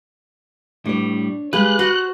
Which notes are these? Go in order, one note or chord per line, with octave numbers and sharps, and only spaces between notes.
A2 G3 D4 C#5
G#3 G4 G#4 B4 F5 F#6
F#4 C5